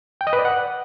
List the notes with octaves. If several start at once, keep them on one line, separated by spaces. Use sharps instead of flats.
G5
D#5
B4
D5
F#5